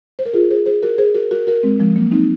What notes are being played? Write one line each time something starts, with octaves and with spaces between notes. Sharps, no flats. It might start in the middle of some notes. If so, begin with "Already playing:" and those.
C5
A#4
F4 G#4
G#4 C5
G#4 C5
F#4 A#4
G#4 C5
F#4 A#4
F#4 A#4
F#4 A#4
G#3 C4
F3 G#3
F#3 A#3
C4 D#4